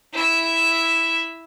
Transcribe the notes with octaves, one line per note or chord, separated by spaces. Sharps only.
E4 E5